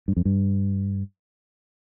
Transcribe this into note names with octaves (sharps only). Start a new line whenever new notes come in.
G2
F2
G2